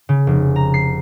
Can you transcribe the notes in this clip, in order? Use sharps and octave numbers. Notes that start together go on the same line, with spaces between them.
C#3
F1
A#5
C7